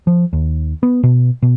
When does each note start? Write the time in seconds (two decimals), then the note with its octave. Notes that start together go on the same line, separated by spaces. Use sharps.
0.07 F3
0.33 D#2
0.83 B3
1.03 B2
1.42 B2